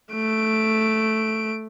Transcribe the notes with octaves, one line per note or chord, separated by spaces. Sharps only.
A3 D7